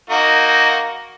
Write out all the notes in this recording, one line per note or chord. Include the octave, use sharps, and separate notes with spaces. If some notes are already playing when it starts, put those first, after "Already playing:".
A#3 D#4 F#4